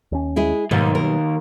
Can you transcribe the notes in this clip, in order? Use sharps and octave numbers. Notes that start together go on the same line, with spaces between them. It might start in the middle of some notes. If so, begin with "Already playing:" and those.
D#2 C#4
G#3 E4 G#4
D#2 G#2 B2 F#3 G3 A#3
A#4